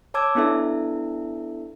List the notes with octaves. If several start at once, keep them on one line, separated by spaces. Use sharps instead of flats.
C#5 A5 D6 E6 G#6
B3 D4 E4 A4 E5